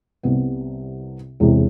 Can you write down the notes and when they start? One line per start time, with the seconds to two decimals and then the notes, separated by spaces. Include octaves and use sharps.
0.23 C2 C3 G3 B3
1.40 E1 E2 C3